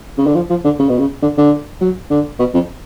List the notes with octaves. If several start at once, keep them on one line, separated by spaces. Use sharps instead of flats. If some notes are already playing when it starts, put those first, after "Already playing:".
C#3
D3
F3
F3
D3
C#3
B2
C#3
D3
D3
F#3
D3
B2
F2